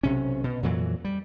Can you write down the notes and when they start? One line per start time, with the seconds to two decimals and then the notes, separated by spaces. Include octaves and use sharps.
0.03 B1 C3 C#4
0.44 B2
0.63 F2 A#2 E3 F#3
1.05 G3